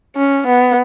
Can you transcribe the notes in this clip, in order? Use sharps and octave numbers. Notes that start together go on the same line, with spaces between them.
C#4
B3